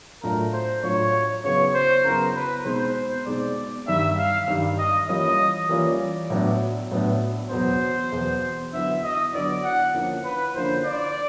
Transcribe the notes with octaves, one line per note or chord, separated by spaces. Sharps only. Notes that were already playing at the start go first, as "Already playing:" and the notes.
A2 F#3 A3 D4 F4 A#4
C5
A2 F#3 A3 D4 F4 C#5
C#3 F#3 B3 E4 C#5
C5
C#3 F#3 B3 E4 A#4
B4
B2 G#3 C4 D#4 C5
B2 G#3 C4 D#4 D5
G2 D#3 G3 E5
F5
G2 D#3 G3
D#5
E3 G3 A#3 C#4 F4 D#5
E3 G3 A#3 C#4 F4 D5
A2 F#3 B3 D4
A2 F#3 B3 D4
E2 B2 F#3 B3 C5
E2 B2 F#3 B3
D3 F#3 B3 E4 E5
D#5
D3 F#3 B3 E4 D5
F#5
D3 F3 A#3 C#4 E4
B4
D3 F3 A#3 C#4 E4 C5
D5